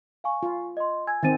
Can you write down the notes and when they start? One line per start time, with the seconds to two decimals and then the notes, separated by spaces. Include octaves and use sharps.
0.24 F5 G#5 C#6
0.43 F4
0.77 D#5 C6
1.07 G#5 E6 G#6
1.23 D#3 C4 G#5 A6 D#7